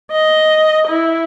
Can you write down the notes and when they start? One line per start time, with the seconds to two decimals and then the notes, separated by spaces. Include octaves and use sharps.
0.11 D#5
0.87 E4